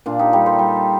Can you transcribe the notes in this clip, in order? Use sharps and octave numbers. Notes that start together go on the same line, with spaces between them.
A#2 D4 F4
D#4 G4
G3 G4 A#4
A4 C5
G3